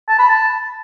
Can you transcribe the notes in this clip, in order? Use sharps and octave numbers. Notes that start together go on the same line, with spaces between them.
A5
B5
A5